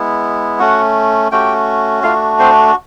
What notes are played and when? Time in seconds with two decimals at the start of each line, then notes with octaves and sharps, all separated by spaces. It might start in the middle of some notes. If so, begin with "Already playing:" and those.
Already playing: G#3 B3 E4
0.59 A3 C#4 F#4 F#5
1.32 A3 C#4 F#4 G4 G5
2.03 A3 D4 F4 F#4 F5
2.39 C4 C5